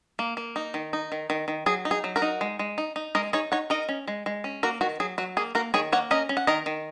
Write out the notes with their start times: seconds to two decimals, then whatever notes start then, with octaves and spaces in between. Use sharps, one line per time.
0.19 A#3
0.37 A#3
0.56 D#4
0.74 D#3
0.93 D#4
1.12 D#3
1.30 D#3
1.48 D#3
1.66 F#3 G#4
1.85 D#4
1.91 G#4
2.04 F#3
2.16 F#4 A#4
2.22 D#4
2.41 G#3
2.59 G#3
2.78 D#4
2.96 D#4
3.15 G#3 A#4 D#5
3.33 D#4 G#4 C#5
3.52 D#4 C#5 F#5
3.70 D#4 A#4 D#5
3.89 C#4
4.08 G#3
4.26 G#3
4.44 C#4
4.63 A#3 F#4 A#4
4.81 D#3 F#4
5.00 F#3 G#4
5.18 F#3 F#4
5.37 A#3 G#4
5.55 A#3 F#4 A#4
5.74 D#3 G#4 C#5
5.92 A#3 C#5 F#5
6.11 C#4 A#4 D#5
6.29 C#4
6.37 F#5
6.47 D#3 A#4 D#5
6.66 D#3